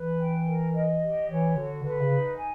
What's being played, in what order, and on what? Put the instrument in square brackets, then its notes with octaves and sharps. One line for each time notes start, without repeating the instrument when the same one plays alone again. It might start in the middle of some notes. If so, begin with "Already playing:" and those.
Already playing: [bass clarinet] E3 [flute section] B4
[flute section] G5
A#4
D#5
G4
[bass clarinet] E3 [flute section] C#5
[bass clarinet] D3 [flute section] F#4
[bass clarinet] D3 [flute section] B4
[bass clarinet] C#3
[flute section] D#4
G#5